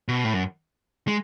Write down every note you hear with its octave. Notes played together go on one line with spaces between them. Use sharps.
B2
A2
F#2
G#3